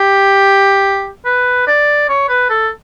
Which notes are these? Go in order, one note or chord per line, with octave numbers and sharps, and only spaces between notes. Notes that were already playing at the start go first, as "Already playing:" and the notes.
Already playing: G4
B4
D5
C#5
B4
A4